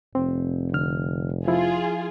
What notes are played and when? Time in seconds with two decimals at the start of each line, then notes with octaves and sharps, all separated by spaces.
0.15 F1 C4
0.73 D3 F6
1.48 F3 E4 F4 G#4